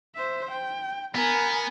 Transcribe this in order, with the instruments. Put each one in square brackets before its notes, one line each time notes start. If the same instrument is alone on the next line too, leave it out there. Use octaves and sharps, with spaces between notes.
[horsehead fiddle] C5 E5
G5
[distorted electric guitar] B3 [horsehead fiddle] A#4 G#5